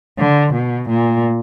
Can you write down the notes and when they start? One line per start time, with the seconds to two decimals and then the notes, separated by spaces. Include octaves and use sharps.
0.19 D3
0.54 B2
0.89 A#2